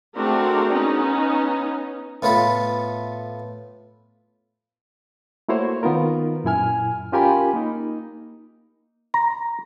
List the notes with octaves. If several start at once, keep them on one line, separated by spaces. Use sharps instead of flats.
A3 C4 D4 F#4 G#4 A#4
B3 C#4 D#4
A2 B3 F4 A4 B5
A3 A#3 E4 F#4 C5 C#5
D#3 B3 D#4 F4 A#4
F#2 A#2 E4 G#5 F6
C#4 F4 G4 A#4 G#5 B5
A#3 D#4
A#5